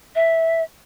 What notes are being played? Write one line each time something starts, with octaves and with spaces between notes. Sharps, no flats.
E5